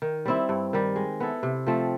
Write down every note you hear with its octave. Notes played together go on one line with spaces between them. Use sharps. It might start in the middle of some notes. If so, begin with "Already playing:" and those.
D#3
G3 C4 E4
G2
D#3 G3
G#3
B3 E4 A4
C3
F3 A3 C4